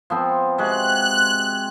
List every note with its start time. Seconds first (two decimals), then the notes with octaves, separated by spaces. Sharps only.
0.10 F3 B3 C4
0.58 C3 G#3 F#4 F#6